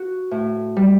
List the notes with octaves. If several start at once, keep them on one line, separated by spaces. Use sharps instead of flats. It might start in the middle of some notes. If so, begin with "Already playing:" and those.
Already playing: F#4
A2
G3